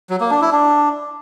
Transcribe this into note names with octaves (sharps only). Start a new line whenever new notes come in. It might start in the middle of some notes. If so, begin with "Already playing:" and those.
F#3
A#3
D4
E4
D4